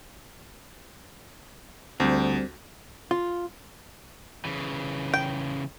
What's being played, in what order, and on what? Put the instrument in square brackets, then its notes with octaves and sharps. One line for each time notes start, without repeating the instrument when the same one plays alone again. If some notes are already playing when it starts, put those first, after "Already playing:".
[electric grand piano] D2 [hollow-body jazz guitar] G3 C4
[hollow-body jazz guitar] F4
[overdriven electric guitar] C#3 E3
[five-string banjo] G5